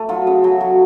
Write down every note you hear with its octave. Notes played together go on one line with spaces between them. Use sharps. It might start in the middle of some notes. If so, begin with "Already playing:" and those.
Already playing: A3
F#3 F4
C#3
F#3
F#3